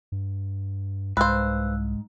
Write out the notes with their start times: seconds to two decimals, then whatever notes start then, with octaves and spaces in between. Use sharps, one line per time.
0.12 G2
1.17 C2 G#2 B4 C5 F5 E6 F#6